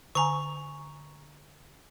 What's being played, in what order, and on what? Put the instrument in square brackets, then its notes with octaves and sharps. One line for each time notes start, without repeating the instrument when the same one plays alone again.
[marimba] D3 G#5 [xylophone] A#5 C#6